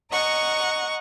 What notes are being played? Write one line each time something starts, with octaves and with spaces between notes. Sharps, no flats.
D#5 F#5 A#5 C#6